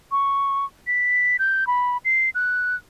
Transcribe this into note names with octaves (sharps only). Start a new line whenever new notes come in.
C#6
B6
G6
B5
C7
F#6